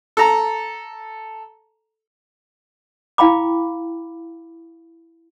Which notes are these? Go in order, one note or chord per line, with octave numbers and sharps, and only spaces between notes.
A4 A#5
E4 F5 G5 B5 D6